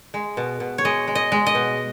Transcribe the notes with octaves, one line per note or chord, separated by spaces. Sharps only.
G#3
B2
B2
C#5
G#3 D#5
G#3
D#5
G#3
D#5
B2